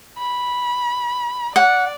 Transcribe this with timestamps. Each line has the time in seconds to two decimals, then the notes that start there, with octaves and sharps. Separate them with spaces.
0.18 B5
1.56 D5 F#5